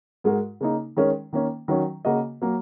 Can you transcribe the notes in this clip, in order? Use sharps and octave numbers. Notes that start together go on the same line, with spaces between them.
G#2 G#3 F#4 A#4
C#3 A#3 D#4
D#3 G#3 C#4 A#4 C#5
D#3 A#3 C#4
D#3 F#3 C#4
C#3 A#3 F#4 D#5
F#3 A#3